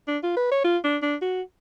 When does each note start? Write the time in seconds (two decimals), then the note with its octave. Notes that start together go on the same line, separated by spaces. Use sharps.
0.08 D4
0.23 F4
0.37 B4
0.51 C#5
0.64 F4
0.84 D4
1.02 D4
1.22 F#4